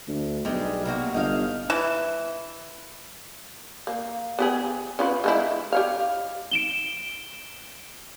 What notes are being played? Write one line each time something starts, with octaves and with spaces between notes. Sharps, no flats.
D2
B1 G3 G#3
C3 A#3 F#4
G1 D#4 F5
E3
A#3
B3 G4 G#4
C#4 F4 B4
G#3 D#4 E4
G4 C#5 F5
D7 E7 G7